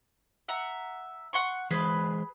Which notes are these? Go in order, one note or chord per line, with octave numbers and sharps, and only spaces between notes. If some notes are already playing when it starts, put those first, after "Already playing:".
E5 F#5 A#5
F#5 C6 C#6
E3 G#3 G#4 B4 C5